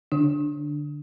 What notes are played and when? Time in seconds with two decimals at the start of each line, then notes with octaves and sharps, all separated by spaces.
0.12 D3 D4